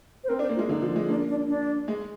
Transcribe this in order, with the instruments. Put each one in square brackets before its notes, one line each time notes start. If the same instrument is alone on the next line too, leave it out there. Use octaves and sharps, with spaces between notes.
[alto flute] C5
[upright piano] C4 [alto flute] A#4
[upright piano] D4
[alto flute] C5
[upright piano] A#3
[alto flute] F4
[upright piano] G#3
[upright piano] D3 [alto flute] D#4
[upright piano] F3
G#3
[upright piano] A#3 [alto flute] D4
[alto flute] D4
D4
[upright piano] G#3